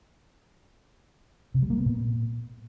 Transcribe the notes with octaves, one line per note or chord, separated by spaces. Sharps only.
C3
G3
A#3
B3
A#2